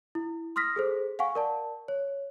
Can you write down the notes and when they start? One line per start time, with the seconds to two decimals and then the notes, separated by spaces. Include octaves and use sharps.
0.15 E4
0.56 C6 D#6 F6 A#6 B6
0.76 G#4 A4 C5
1.19 F5 F#5 G#5 C#6
1.35 A#4 D5 A5
1.88 C#5